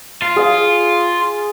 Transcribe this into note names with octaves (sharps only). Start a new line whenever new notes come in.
F4
G#4 F5